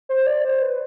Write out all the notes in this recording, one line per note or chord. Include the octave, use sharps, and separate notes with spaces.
C5
D5
C5
B4